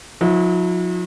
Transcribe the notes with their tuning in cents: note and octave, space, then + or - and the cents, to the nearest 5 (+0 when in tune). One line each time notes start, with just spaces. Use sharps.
F#3 -45 E4 -30